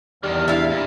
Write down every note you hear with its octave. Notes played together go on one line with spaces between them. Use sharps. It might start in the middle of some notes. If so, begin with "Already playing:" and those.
E2 D#3 G3 D4 F6
D4 E4 E5 F5
A#2